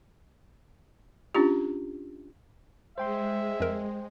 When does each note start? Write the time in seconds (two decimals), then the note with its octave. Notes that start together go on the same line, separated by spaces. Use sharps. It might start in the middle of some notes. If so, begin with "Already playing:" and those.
1.35 C#4 D4 F4 G4
2.98 G#3 C5 E5 G5 C6
3.60 F2 A#4